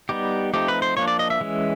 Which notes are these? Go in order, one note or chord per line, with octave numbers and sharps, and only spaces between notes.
G3 B3 D#4 G4
F3 A3 C4 D#4 G4
B4
C5
F3 A#3 D4 C#5
D5
D#5
E5
E3 G#3 C#4